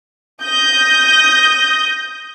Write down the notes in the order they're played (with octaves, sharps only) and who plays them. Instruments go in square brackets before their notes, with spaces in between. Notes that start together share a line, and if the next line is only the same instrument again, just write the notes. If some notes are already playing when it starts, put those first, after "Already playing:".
[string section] D#6 G6 A#6